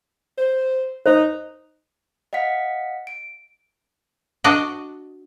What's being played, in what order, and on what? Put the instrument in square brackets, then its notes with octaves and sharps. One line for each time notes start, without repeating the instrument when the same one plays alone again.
[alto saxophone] C5
[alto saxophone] D#4 [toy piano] C5
[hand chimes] D#5 F5 F#5 B6 C#7
D7
[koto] D4 F#4 D5 D#5